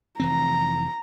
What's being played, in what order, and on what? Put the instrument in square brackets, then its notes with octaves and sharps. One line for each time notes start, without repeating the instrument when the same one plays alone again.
[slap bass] F1 E3 C4 [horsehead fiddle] A#5